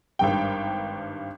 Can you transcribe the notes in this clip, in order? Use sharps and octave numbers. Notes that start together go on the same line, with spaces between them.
G#1 G2 G5